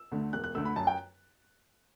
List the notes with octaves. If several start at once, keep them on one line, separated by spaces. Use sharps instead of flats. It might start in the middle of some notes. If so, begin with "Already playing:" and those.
Already playing: E6
D2 D3 A3
E1 F#6
F#6
D2 D3 A3 E6
B5
F#2 A5
G5